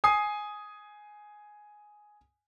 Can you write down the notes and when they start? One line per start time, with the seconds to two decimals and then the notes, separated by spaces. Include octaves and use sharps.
0.04 G#5 D#6 C7